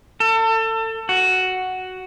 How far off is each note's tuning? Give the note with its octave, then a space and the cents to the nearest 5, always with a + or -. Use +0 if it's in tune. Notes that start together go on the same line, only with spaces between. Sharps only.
A4 +30
F#4 +5